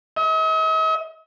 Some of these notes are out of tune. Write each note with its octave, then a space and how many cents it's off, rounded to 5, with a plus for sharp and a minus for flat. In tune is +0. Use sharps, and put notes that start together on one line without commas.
D#5 +45